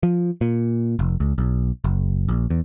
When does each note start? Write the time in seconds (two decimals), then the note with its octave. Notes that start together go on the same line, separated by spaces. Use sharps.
0.03 F3
0.41 A#2
0.99 F1
1.20 C#2
1.38 B1
1.84 F#1
2.29 A#1
2.50 E2